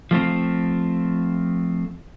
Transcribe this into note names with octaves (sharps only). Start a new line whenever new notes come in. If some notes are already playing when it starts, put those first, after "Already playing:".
F3 A3 C4 F4